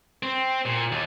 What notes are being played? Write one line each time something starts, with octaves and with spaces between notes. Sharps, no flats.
C4
A#2
D#2